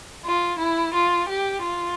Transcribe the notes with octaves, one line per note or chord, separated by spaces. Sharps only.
F4
E4
F4
G4
F4